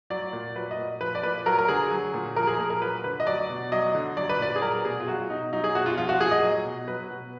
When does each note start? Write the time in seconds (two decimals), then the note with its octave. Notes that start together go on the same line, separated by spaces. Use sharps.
0.10 F#3 D5
0.33 A#2
0.56 F#3 B4
0.71 D#5
0.78 A#2
1.01 F3 B4
1.15 D5
1.23 A#2 B4
1.46 F#3 A#4
1.59 A#4
1.68 D3 G#4
1.91 F#3
2.14 A#2
2.36 F3 A#4
2.47 G#4
2.58 A#2 A#4
2.70 A#4
2.81 F#3 B4
3.04 D3 B4
3.20 D#5
3.27 F#3 D5
3.49 B2
3.72 F#3 D#5
3.95 D3
4.17 F#3 D5
4.29 B4
4.40 A#2 D5
4.56 G#4
4.62 F#3 A#4
4.85 B2 G#4
5.00 F4
5.07 F#3 F#4
5.30 B2 D#4
5.53 F#3 D#4
5.64 G#4
5.75 B2 F#4
5.86 F4
5.97 F3 F4
6.09 F#4
6.20 A#2 G#4
6.31 D#5
6.43 F#3
6.65 B2
6.88 F#3 B4
7.11 B2